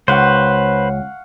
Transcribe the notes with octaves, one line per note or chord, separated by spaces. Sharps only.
C#2 C#4 B4 C5 F5 F#5 C#6